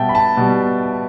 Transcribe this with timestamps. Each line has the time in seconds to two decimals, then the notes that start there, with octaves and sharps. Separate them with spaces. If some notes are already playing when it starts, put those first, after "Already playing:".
Already playing: B2 G3 E5 G5 A5
0.09 B5
0.15 A5
0.37 B2 G3